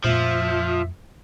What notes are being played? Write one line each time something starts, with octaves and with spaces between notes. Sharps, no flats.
F2 A#2 F3 A3 E5